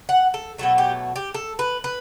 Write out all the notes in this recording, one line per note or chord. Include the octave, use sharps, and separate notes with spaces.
F#5
A4
B2 F#3 A3 A4
G4
G4
A4
B4
B4